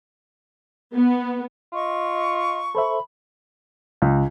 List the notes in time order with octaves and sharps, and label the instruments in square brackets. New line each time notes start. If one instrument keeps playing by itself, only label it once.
[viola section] B3
[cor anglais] F4 [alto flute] D#5 [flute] C#6
[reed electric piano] A4 C5 E5 [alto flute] B5
[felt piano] C#2